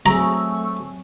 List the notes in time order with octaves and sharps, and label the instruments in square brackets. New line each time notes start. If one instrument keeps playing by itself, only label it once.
[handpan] F#3 C4 G#4 [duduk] A3 [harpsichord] A#5 [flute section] C#6 E6